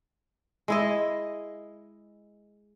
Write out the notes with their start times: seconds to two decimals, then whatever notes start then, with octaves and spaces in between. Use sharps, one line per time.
0.68 G#3 E4 D#5